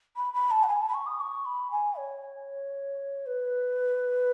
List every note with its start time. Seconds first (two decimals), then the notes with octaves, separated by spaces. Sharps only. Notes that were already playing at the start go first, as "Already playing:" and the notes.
0.16 B5
0.33 B5
0.51 A5
0.63 F#5
0.68 G#5
0.81 A5
0.88 B5
0.94 C#6
1.06 D#6
1.20 C#6
1.45 B5
1.71 G#5
1.97 C#5
3.26 B4